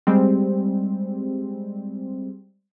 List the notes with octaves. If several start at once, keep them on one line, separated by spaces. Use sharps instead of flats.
G3 G#3 C4